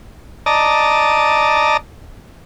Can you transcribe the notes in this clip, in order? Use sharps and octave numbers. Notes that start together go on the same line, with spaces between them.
D5 D#5 A5 A#5